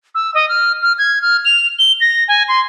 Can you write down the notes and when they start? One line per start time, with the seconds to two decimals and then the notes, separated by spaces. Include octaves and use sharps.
0.15 E6
0.34 D#5
0.49 F6
0.82 F6
0.98 G#6
1.22 F6
1.45 F7
1.79 G7
2.01 A#6
2.28 G#5
2.48 C6